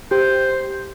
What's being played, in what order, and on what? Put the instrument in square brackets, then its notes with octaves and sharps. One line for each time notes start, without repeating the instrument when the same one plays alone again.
[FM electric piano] G4 [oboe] C5